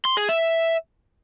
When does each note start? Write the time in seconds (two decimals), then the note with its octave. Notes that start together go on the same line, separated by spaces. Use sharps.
0.05 C6
0.17 G#4
0.29 E5